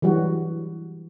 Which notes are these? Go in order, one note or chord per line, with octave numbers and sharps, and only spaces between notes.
E3 F#3 G3 F#4